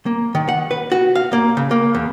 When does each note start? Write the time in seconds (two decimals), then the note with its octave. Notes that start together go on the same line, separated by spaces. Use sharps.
0.06 A#3
0.35 D#3
0.49 F#5
0.71 B4
0.92 F#4
1.15 F5
1.33 A#3
1.57 C#3
1.71 A#3
1.95 E2